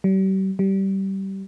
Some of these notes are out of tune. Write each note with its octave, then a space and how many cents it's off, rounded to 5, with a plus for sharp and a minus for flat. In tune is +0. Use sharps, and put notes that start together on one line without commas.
G3 -40
G3 -20